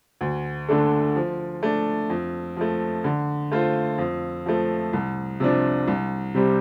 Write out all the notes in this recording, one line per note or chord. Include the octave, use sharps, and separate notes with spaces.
D2
D3 A3 D4 A4
F3
A3 D4
F2
F3 A3
D3
A3 F4 C5
F2
F3 A3
C2
C3 F3 D4
C2
C3 G3 C4 G4